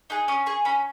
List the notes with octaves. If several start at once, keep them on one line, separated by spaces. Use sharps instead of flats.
D#4 G#4 F#6
C#4 D#6
G#4 C#6
C#4 B5